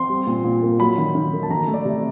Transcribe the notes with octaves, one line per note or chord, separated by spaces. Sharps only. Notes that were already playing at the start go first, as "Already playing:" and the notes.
Already playing: C4 C6
G3
A#2
A#2
A#3
F#3 B5
D#3
D#3
A#3
A5
D#3 A#5
A3
D5
C3